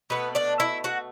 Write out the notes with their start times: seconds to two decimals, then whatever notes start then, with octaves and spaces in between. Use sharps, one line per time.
0.10 B2 A3 B3 B4
0.35 D4 D5
0.60 E4 E5
0.84 F#4 F#5